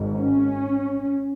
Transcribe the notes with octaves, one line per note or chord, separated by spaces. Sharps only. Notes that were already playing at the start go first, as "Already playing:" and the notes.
Already playing: G#1 G#2
C#4